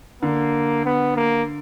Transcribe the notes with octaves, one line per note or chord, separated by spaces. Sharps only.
D3 A#3
B3
A#3